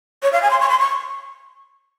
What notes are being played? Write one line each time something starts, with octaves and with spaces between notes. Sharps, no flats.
C#5
F5
G#5
C6
C#6
C6
C#6